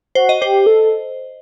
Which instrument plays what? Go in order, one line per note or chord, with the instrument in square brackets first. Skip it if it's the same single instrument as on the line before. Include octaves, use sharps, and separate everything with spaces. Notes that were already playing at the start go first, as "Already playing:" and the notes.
[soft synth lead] F#4 [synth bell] C5
[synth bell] D#5
[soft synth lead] G4 [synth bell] C5
[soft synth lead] A4